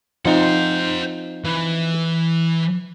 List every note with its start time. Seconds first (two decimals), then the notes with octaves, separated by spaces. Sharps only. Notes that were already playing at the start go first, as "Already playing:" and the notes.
0.25 F3 C4 D#4 C5 F#5
1.45 E3